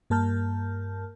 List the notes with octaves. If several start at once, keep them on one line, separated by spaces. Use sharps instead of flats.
G2 A#3 A#4 A5 F6 G6